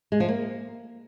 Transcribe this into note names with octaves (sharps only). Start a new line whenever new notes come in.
G#3
F3
A#3